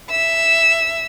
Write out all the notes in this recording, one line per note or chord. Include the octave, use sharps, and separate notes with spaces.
E5 E6